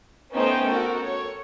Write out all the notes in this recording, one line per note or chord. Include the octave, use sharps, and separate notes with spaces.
A3 B3 C#4 D#4 C5 G5
F#4 A4 A#4
C#5